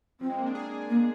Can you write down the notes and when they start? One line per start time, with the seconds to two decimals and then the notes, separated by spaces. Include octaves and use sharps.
0.20 F3 C4
0.30 G#3
0.38 A#3
0.46 D4
0.55 G#4
0.89 A#3